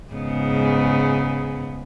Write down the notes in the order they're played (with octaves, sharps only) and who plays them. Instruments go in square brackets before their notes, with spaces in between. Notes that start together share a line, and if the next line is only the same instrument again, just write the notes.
[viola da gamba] G#2 C#3 B3